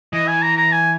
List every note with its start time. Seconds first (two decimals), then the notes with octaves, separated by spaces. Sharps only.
0.13 E3 D#5
0.28 G#5
0.42 A#5
0.57 A#5
0.72 G#5